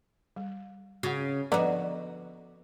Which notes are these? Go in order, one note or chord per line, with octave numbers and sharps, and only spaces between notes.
G3
C#3 F#4 F#5
D3 F3 B3 F#4 B4 D5 D#5 A#5